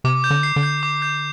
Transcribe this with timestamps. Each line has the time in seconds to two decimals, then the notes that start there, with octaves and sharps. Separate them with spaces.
0.04 C3 D6
0.24 G6
0.30 D3
0.43 C7
0.56 D3
0.63 G6
0.83 D6
1.02 G6